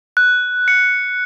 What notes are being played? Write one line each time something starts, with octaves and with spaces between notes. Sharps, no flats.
F#6
C#7